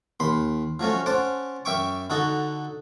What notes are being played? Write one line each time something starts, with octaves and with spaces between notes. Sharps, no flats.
D#2 B5 C6
F3 F#3 A3 C#4
C#4 C5 F#5 A5 D6
F#2 E5 G5 C#6 D6
D3 D#4 F#4 A4